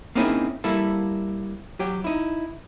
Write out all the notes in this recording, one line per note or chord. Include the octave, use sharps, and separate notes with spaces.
A#3 C4 C#4 D#4 E4 G#4
G3 A#3 E4 A4
F#3 G4
D#4 E4